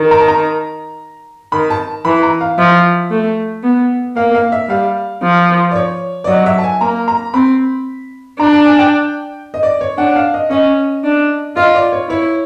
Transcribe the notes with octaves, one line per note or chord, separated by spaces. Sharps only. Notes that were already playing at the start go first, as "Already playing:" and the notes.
Already playing: D#3
A#5
A5
A#5
D#3 B5
A5
E3 B5
A#5
F5
F3 E5
A3
B3
A#3 F5
F5
E5
G3 F5
F3
D5
C#5
D5
F#3 D#5
E5
A5
G#5
A#3 A#5
A#5
C4 B5
D4 A#5
A5
G#5
G5
D#5
D5
C#5
D4 F#5
F5
D#5
C#4 D#5
D4
F4 D#5
D5
C#5
E4 C#5